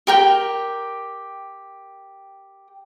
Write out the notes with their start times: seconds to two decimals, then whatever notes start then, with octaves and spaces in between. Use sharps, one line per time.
0.07 G4 A#4 G5